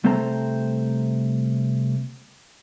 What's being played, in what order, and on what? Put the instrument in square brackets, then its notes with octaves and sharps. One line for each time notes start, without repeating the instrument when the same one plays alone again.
[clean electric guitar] C2 A3 C4 A4 C5 A#5